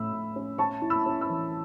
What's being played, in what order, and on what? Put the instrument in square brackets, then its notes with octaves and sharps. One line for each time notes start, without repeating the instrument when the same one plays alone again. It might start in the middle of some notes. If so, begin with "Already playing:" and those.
Already playing: [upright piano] A2 A3 C#4 [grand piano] B5 E6
[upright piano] A2
C#4
[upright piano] C#4 [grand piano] A5 C#6
[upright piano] E4
[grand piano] B5 E6
[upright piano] C#4
[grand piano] B5 E6
[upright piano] E3